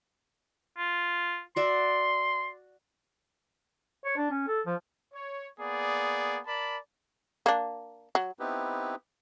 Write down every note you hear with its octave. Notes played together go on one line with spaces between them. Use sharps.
F4
F#4 D5 E5 C6
C#5
D4
C#4
A4
F3
C#5
A#3 B3 G#4 D5
A#4 D5 A5 B5
A#3 D4
F#3
B3 C4 D#4 E4 G4 B4